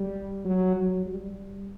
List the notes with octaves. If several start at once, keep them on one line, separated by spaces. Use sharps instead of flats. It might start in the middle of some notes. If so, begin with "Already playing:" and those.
Already playing: G3
F#3
F#3
G3